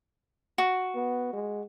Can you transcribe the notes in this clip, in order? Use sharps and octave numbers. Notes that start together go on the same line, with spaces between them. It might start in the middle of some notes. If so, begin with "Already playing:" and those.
F#4
B3
G#3